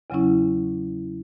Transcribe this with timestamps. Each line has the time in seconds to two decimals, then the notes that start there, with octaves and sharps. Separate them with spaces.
0.10 E2 C#3 F#3 C#4 E4